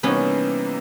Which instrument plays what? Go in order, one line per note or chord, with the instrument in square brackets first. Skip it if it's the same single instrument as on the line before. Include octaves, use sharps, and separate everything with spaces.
[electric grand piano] C3 E3 G3 A#3 D#4 [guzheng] B3 C#4